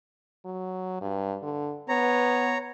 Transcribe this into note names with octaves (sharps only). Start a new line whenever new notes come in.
F#3
G2
D3
B3 C#5 A#5